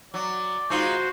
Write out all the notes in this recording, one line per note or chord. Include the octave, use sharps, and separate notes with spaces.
F#3 D5
G#3 D#4 F4 F#4 C5